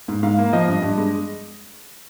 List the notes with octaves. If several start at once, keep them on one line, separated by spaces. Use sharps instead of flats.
G#2
G#2 F5
A#3
F3 D#5
G2
G2
G#3